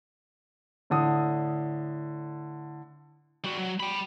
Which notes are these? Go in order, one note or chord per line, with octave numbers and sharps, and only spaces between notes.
A2 D3 D#6
G3 F#4
F#3
G5 B5